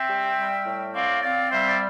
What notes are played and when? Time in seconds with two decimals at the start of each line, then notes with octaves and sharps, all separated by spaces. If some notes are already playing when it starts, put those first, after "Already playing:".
Already playing: C4 E5 G5
0.10 G3
0.38 G3
0.66 A2
0.94 C4 D5 F5
1.23 C4 D5 F5
1.51 G3 C5 E5
1.68 D5